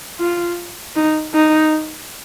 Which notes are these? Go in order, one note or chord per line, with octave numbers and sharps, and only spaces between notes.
F4
D#4
D#4